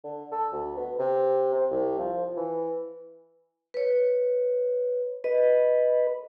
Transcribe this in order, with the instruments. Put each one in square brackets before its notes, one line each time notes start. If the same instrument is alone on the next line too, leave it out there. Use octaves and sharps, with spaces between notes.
[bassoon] D3
A4
D2
B3
C3
C4
C2
F3
E3
[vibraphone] B4 C#5
[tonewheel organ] B4 [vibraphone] D#5